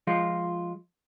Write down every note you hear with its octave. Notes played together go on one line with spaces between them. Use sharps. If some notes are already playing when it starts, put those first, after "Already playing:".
F3 G#3 F4